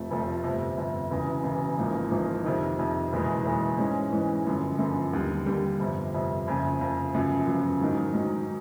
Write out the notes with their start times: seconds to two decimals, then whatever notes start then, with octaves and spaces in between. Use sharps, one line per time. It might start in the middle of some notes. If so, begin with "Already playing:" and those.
Already playing: F1 F2 C3 F3 A3
0.10 F1 F2 C3 F3 A3
0.43 G1 F2 C3
0.77 G1 F2 C3
1.11 E1 E2 C#3
1.43 E1 E2 C#3
1.78 A1 G#2 F3 A#3
2.11 A1 G#2 F3 A#3
2.44 F2 C3 D#3
2.78 F2 C3 D#3
3.12 F#1 E2 B2 G#3
3.44 F#1 E2 B2 G#3
3.78 G#2 E3 G#3 C#4
4.12 G#2 E3 G#3 C#4
4.46 G1 F#2 D3 F3
4.79 G1 F#2 D3 F3
5.13 D#2 D3 G3
5.46 D#2 D3 G3
5.79 G1 F2 C3
6.14 G1 F2 C3
6.47 F#1 F2 C#3
6.80 F#1 F2 C#3
7.14 G1 F#2 C#3 F3
7.47 G1 F#2 C#3 F3
7.81 G#2 D#3 F#3
8.14 G#2 D#3 F#3